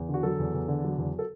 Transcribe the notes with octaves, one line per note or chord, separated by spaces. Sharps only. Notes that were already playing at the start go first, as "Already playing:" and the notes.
Already playing: E2
D3
F#4
F#3 A4
E2
E2
D3
F#3
E2
A4